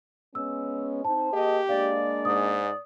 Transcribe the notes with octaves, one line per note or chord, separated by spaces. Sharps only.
G#3 B3 C#4 E6
C4 D#4 C5 A5
A#3 G4 G#4 D#5
G#3 A#3 D4 D5 F5
G#2 D#6